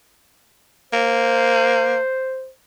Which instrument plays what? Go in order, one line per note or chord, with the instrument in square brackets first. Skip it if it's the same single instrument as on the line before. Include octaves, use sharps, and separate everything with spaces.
[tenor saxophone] A#3 [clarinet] C5